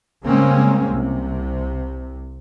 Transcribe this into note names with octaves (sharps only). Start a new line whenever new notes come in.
C#3 G3 G#3 A#3 C4 C#4
C2 C3